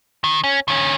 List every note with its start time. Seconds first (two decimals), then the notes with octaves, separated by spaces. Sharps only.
0.24 D#3
0.44 C#4
0.68 D#3 C#4